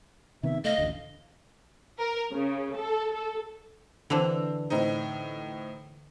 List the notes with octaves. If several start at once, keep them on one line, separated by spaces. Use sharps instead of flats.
C3 D#3 B3 E5
A3 D#5 F5
A1 D2
A#4
C#3
A4
A4
D3 E3 C4 D4 E6 F7
A2 C4 D#4